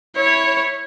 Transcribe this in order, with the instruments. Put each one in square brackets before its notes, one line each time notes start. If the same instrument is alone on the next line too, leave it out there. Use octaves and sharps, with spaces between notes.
[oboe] E4 [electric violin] C#5